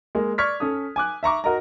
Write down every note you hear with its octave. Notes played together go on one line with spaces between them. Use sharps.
G#3 A#3
D5 C#6 F6 G#6 B6
C#4 A4 D#6
G#5 D6 F#6
E5 A#5 C#6 D6
F#4 A#4 D#5 A#5